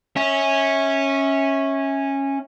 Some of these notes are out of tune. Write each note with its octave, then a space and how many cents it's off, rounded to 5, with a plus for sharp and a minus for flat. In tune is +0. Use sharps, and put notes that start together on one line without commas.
C#4 -10 E5 -25